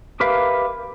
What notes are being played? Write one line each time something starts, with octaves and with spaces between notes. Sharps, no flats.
G4 A#4 B4 E5 F5